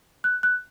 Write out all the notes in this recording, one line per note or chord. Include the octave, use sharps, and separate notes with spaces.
F#6
F#6